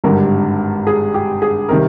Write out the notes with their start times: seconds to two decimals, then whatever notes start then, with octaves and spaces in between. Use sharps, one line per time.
0.04 G#1 G2 D3 G3 A#4
0.87 G#4
1.14 G4
1.42 G#4
1.69 C3 D#3 G3 A#4